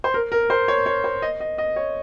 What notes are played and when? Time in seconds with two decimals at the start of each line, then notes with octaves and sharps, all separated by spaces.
0.04 C5
0.14 A#4
0.32 A#4
0.50 C5
0.68 C#5
0.86 C#5
1.04 C5
1.22 D#5
1.40 D#5
1.58 D#5
1.76 C#5